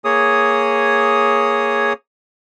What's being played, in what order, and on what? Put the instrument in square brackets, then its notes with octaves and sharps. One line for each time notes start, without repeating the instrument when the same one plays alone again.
[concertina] A#3 G#4 C#5 D#6